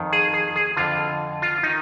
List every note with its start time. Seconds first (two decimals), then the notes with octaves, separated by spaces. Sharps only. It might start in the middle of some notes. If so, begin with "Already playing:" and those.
Already playing: F2 D#3
0.13 G#4
0.34 G#4
0.56 G#4
0.77 F2 D3 F4
1.42 F4
1.63 D#3 D#4